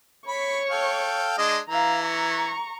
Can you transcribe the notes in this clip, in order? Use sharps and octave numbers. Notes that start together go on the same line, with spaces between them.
C#5 B5 C#6
A4 F5 G5
G#3 D4 D#5
E3 F5 A#5
A#5 C#6